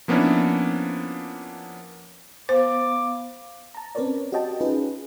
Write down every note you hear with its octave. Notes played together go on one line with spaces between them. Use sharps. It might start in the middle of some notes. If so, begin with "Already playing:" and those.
F3 A#3 B3 C#4 D4 E4
B3 C5 F5 D6
A5 A#5
C4 C#4 A#4 B4 C#5 D5
F#4 G4 C#5 D#5 G5 A5
C#4 D#4 F4 G#4 B4